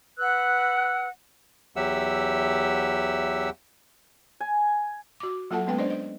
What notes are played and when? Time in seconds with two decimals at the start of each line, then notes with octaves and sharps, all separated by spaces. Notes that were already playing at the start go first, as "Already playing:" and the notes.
0.19 B4 F#5 E6 F#6
1.76 E2 F#3 G4 E5 F#5 E6
4.40 G#5
5.20 F#4 D6
5.51 F#3 A#3 F4 A4 F#5 A5
5.67 G#3 A#3 B3 C#4 B4 G5
5.78 D4 C5 D5 D#5
5.90 D#5